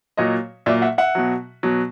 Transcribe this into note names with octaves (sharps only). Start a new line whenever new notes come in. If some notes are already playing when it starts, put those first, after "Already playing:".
A#2 F#3 C#5 D#5
A#2 F#3 D5 E5
E5 F#5
E5 F#5
B2 F#3
B2 F#3